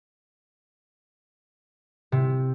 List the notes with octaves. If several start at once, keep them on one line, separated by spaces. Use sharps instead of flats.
C3